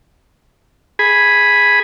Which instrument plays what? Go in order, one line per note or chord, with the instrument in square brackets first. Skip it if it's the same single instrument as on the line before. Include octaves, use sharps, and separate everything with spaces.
[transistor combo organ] G#4 B5